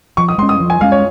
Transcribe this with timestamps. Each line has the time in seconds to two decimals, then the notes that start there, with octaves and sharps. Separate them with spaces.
0.17 F3 C#6
0.28 D#6
0.38 G#3 C6
0.42 C#4
0.49 D#6
0.60 F3
0.70 G#5
0.81 G#3 C#4 F5
0.92 C#5